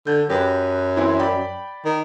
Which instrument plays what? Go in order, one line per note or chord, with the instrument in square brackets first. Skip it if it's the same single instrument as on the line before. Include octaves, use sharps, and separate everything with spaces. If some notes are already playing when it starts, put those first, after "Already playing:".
[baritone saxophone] D3 [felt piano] G6
[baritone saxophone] F#2 [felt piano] G4 B4
[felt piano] E3 C4 E4
D5 G5 B5
[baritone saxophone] D#3